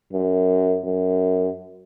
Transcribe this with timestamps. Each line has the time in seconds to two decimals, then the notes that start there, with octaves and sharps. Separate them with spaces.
0.13 F#2
0.84 F#2